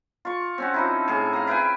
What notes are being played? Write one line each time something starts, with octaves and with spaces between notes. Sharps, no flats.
F4 C#6
C4 C#4 F#4
F3 D#4 E4
A2 G#4
F5 A#5
E4 B4 G5 G#5